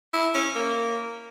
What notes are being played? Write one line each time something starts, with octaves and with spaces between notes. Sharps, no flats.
E4
C#4
A#3